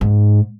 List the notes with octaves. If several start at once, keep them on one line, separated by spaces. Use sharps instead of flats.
G#2